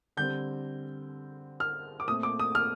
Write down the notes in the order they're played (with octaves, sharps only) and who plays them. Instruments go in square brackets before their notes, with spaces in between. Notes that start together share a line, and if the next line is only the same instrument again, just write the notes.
[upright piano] D3 G3 C4 G6
F6
D6
A#2 A3 C4 D#6
D6
D#6
F6